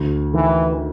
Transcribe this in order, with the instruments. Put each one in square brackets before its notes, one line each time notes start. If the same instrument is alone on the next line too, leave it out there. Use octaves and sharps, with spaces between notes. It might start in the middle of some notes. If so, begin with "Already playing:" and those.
Already playing: [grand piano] D2
[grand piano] D#3 [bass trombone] E3